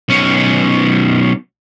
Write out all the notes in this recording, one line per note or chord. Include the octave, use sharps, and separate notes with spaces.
B1 C#4